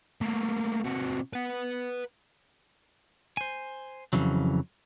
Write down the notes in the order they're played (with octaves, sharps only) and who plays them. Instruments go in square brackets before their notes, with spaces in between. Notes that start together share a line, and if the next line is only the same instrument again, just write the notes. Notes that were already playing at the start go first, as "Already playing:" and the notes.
[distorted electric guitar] A3 A#3
C3 F#4
B4 F#5
[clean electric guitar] C5 G#5
F2 C#3 E3 F#3